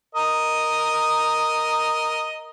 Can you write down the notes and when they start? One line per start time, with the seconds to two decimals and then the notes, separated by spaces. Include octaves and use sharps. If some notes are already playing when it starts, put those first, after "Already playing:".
0.15 A#4 D#5